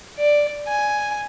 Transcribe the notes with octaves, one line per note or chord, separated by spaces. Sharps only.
D5
G#5